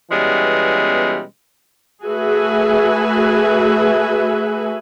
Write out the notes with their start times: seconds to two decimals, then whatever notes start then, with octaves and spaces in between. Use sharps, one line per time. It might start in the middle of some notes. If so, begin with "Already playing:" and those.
0.11 B2 E3 G3 G#3 B3 C#4
2.05 A3 F#4 G#4 B4 E5 G#5